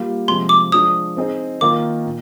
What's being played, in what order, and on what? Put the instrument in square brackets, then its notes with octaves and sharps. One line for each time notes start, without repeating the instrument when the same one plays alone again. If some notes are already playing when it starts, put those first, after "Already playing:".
Already playing: [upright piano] G3 A#3 F4
[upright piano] C3 F3 G#3 [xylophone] C6
[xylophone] D6
[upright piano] F3 G#3 D4 [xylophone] D#6
[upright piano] C4 D#4 G#4 D#5
[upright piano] D#3 A#3 F4 A#4 [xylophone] D6
[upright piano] A#2